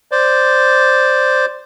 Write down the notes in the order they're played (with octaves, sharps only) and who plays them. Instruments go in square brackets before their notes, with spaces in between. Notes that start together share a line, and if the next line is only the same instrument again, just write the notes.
[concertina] C5 D5